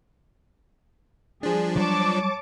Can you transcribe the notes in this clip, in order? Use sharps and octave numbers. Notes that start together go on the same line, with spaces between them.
F3 G3 D4 G#4
F#3 G3 C#5 A5 D6